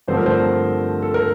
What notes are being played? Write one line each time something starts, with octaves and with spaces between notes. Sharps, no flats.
G2 D3 F3 A3 C4 C5
A#4
C5
A4
A#4